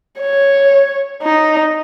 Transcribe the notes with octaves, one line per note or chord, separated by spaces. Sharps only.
C#5
D#4